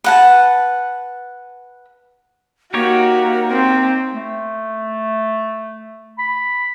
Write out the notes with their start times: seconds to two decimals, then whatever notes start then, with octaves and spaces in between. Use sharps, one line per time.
0.04 B4 F#5 A5
2.74 A#3 D#4 F#4 G4 C#5
3.51 C4
4.12 A3
6.19 B5